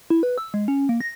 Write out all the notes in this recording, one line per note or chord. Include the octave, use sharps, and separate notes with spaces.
E4
B4
E6
G#3
C#4
A#3
A#6